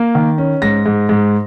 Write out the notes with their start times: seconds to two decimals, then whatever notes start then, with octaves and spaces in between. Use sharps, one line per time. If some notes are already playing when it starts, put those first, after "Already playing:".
Already playing: A#3
0.15 D#3
0.38 C#4
0.62 G#2 A#6
0.86 G#2
1.09 G#2